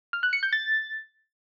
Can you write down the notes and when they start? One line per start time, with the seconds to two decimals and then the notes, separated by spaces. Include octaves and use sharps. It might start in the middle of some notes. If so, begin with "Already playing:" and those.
0.13 F6
0.23 F#6
0.33 C#7
0.43 G6
0.53 A6